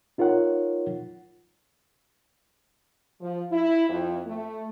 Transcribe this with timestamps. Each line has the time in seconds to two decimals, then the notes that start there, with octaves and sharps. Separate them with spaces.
0.18 D#4 F4 A#4 C#5 F#5
3.21 F3
3.52 E4
3.90 F2
4.27 A3